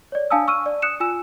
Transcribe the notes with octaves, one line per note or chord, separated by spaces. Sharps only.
C#5 D5
D4 F5 G#5 A5 D#6 E6
C#6 E6 F6 D#7
D5
D#6 F#6 C#7 E7
F4 G#5 E6 E7